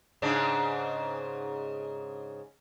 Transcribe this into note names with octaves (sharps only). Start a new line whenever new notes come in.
G#2 C#3 D4